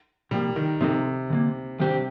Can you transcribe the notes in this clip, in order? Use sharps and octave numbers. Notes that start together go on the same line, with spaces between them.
C3 F3 G3 A#3
D#3
C3 F3 C4 D#4 A4
D3 G3 A#3
C3 D#3 G3 D4 G4 C5